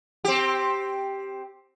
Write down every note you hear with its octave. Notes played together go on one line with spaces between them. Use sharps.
C4 G4